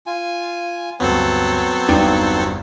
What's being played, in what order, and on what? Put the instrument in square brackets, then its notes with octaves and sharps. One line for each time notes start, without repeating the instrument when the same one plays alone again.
[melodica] F4 G#5
[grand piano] D2 G2 [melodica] F#3 C#5 [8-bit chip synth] B3 C4 A4
[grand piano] G1 E2 G2 [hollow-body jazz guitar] D4 D#4 G5